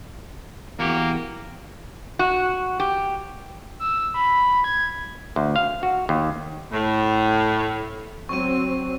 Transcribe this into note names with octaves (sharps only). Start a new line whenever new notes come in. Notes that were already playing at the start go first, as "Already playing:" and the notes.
E2 A#3 F#4 G4
F#4
G4
E6
B5
G#6
D2
F5
F#4
D#2
A2
F#3 C4 C#6 D#7